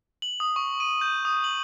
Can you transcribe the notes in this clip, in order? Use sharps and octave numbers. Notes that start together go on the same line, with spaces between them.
F#7
D#6
C#6
D#7
G6
D#6
F#7